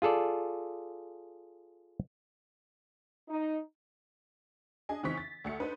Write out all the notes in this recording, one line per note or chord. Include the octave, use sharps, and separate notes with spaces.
F4 G#4 A4 D5
D#4
D4 G#4 D#5 G#5
C#3 E3 C4 D#4 C#6 B6
A6
D2 A3 C#7
D4 D#4 B4 C5